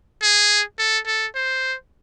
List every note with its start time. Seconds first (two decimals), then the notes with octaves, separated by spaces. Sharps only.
0.22 G#4
0.79 A4
1.07 A4
1.35 C5